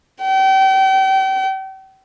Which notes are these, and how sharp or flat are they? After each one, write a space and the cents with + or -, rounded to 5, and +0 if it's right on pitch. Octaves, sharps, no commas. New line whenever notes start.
G5 -35